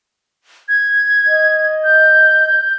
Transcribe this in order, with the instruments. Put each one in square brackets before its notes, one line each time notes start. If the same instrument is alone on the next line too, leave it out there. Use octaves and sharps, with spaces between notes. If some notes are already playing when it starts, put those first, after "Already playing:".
[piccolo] G#6
[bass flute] D#5
[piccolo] G6